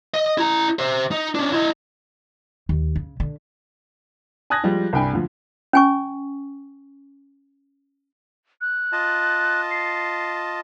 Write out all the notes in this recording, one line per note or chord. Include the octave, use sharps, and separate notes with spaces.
D#5
E4 A#5
C5 E5
D#4
C#4 D4
E4 D#5
D#2
C#3
D3
G#5 A5 D#6 F#6 G#6 A#6
F3 G3 G#3
C2 G2 G5 G#5 B5
D2 F3
C#4 G#5 C#6
F#6
F4 D#5 A5
C7